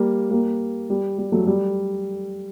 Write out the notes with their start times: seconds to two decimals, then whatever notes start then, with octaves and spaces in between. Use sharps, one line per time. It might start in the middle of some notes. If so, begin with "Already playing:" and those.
Already playing: G3 A#3
0.31 G3 A#3
0.90 G3
1.18 G3
1.32 F#3 A3
1.47 G3